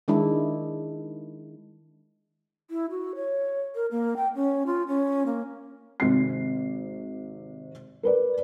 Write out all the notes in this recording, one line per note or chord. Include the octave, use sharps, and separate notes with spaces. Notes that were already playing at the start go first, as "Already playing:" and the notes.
D#3 G#3 D4 E4
E4
F#4
C#5
A#4
A#3
G5
C#4
F4
C#4
A#3
G#1 C3 C7
A#4 B4 D5